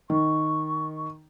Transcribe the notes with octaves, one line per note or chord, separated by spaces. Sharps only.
D#3 C#6